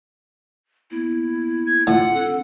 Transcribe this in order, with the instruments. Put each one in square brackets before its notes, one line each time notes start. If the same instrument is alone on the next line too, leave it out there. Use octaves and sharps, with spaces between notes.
[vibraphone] A#3 B3 [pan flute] E4
[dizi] G#6
[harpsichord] A2 [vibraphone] D4 [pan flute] F4 [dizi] F#5
[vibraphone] C4 D4 D#4 [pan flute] A4